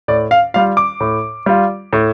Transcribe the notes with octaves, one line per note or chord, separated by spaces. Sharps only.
A2 D5
F5
G3 F4 F5
D6
A2
G3 F4
A2